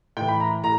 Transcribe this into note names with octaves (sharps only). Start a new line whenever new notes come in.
A2 E3 G5
B5
A#5
A2 A#5